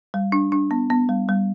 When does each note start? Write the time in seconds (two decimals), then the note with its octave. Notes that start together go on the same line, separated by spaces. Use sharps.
0.14 G3
0.32 D4
0.52 D4
0.71 B3
0.90 B3
1.09 G3
1.29 G3